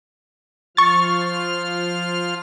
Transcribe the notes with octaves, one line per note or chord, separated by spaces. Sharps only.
F3 F4 C#6 F6 A6